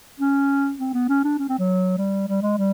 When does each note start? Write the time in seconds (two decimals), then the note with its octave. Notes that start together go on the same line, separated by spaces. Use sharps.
0.20 C#4
0.80 C4
0.94 B3
1.09 C#4
1.25 D4
1.39 C#4
1.49 C4
1.59 F#3
1.98 G3
2.28 G3
2.42 G#3
2.58 G3